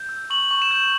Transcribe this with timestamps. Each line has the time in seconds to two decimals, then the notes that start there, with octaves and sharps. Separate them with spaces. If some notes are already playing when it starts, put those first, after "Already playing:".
Already playing: G6
0.09 E6
0.30 C#6 F#7
0.51 C#6
0.62 E7
0.71 G6